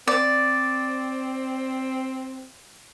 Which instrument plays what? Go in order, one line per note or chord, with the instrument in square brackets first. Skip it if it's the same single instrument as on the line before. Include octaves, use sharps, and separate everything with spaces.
[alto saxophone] C4 [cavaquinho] D5